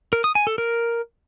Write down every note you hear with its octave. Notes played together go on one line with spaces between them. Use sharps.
A#4
D#6
G#5
A4
A#4